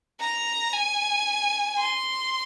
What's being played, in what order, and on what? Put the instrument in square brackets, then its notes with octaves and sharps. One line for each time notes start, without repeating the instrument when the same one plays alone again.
[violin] A#5
G#5
C6